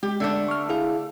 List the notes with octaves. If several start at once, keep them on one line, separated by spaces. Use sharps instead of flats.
G#3 G4
D3 A3 D4
C#6 F6
E4 G#4 F5